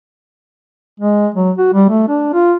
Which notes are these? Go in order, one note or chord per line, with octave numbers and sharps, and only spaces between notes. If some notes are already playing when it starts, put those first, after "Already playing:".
G#3
F#3
F#4
G3
A3
D4
F4